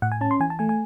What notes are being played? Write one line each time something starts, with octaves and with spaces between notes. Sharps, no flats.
A2 F#5
G#5
C#4 A5
C6
E3 G#5
A5
A3 G#5
G#5